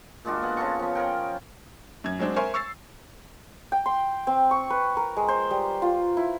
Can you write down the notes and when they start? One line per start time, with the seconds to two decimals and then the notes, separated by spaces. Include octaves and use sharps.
0.25 A#2 G#3 D4 F#4
0.42 B3 G#4 F#5
0.57 C#3 F4 A4 C#6
0.79 F3 B3
0.95 C#4 G#4 A#4 G5
2.04 F#2 G#6
2.19 F#3 G#3 C4 D4
2.36 A#4 C5 E5 G#5 C6 C#6
2.54 C#6 E6 A6 C7
3.72 G5
3.86 C6
4.27 C4
4.51 C#6
4.70 B4
4.97 A#4
5.16 G#3
5.28 C5
5.50 G3
5.82 F4
6.17 E4